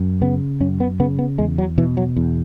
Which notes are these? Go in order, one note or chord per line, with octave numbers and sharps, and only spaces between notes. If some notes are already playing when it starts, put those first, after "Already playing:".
Already playing: F#2
C#3 B3
F#2 C#4
B3
C#3 B3
B3
E2 G#3
F#3
B2 E3
F#3
E2